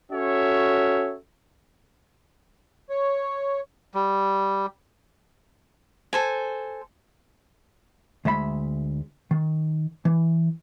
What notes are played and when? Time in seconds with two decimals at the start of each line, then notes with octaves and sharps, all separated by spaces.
0.12 C#4 F#4 A4 C#5 E5
2.90 C#5
3.94 G3
6.13 A4 C5 G#5
8.25 D2 G#3 E5 B5
9.31 D#3
10.05 E3